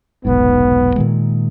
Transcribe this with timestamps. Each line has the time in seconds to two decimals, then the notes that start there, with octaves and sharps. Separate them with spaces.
0.25 F1 B1 G#2 B3
0.96 A#2 D#3 G#3